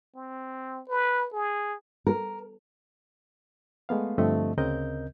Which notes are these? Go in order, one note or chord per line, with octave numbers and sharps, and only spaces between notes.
C4
B4
G#4
A#4
G#3 A3 B3 F5
G2 D3 F3 A3 C4 D#5
D2 C#3 C4 A#4 D#5 G6